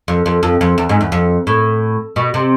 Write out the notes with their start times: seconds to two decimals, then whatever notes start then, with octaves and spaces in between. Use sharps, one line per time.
0.08 F2
0.26 F2
0.43 F2
0.61 F2
0.78 E2
0.89 G#2
1.01 E2
1.12 F2
1.47 A2
2.16 B2
2.34 C3